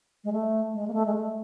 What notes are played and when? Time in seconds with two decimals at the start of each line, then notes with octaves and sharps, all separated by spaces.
0.24 G#3
0.32 A3
0.73 G#3
0.88 A#3
0.93 A3
1.06 G#3
1.14 A3